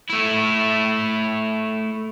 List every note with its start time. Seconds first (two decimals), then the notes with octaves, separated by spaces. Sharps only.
0.09 A3 E4